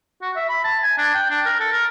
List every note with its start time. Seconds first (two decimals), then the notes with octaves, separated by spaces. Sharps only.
0.22 F#4
0.36 E5
0.49 B5
0.64 A5
0.83 G#5
0.98 D4
1.14 G5
1.30 D4
1.45 A#4
1.60 A4
1.72 A#4